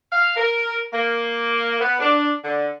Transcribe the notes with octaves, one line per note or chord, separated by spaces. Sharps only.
F5
A#4
A#3
B3
D4
D3